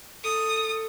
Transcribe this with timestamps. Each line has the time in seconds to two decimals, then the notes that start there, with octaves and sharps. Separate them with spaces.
0.24 A4 D#6